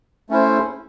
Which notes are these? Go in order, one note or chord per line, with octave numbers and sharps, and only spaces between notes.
A3 C#4 E4 C5